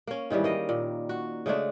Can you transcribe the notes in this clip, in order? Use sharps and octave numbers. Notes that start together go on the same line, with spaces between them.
A#3 C#4
G#2 D#3 E3 G3
A#3 D#5
A#2
F#4
C#3 G#3 A3 D4